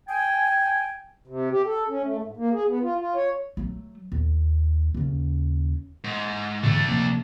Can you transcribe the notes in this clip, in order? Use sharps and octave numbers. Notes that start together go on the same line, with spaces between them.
G5 G#5
C3
G4
A4
C#4
A3
G#2
A#3
G#4
B3
F4
F4
C#5
F#3 A3
D#2
D#2 C#3
G#2
G#2 D3 E3 A3 D4
C3 F3 A#3